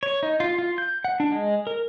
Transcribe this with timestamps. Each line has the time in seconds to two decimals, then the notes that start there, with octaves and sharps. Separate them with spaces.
0.03 C#5
0.23 D#4
0.40 F4
0.58 F4
0.78 G6
1.04 F#5
1.20 D4
1.32 G#3
1.67 A#4